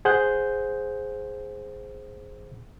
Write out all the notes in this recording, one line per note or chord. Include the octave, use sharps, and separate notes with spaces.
G#4 C5 F#5 F#6 G6